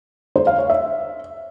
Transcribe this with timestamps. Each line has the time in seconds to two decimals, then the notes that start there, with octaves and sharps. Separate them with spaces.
0.36 C5
0.47 F5
0.58 C#5
0.70 E5